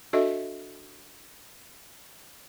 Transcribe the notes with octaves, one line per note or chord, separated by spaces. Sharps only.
D4 F#4 A4 D#5 E5